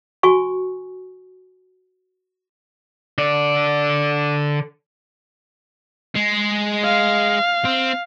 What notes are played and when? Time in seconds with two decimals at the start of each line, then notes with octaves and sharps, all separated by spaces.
0.23 F#4 G#5 C#6
3.18 D3 D5
6.16 G#3
6.84 F5
7.65 C4